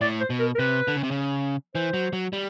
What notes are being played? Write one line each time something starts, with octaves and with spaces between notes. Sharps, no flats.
A2 D5
C5
B2
A#4
A#4
C3 B4
D3
C#3
C3
C#3
E3 C5
F#3
F#3
G3